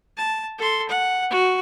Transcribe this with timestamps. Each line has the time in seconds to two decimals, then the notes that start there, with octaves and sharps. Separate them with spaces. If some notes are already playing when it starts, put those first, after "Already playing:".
0.17 A5
0.59 A4 C6
0.89 F#5
1.30 F#4